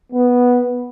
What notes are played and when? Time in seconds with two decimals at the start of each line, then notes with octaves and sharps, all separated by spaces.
0.12 B3